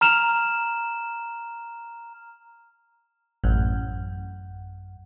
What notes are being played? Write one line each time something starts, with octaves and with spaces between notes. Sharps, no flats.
A#5 F6 E7 F7
A1 F#2